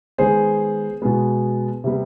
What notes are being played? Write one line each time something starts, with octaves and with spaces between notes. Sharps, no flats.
D#3 G#3 B3 G#4 C5
B2 G#3 B3
C3 G3 B3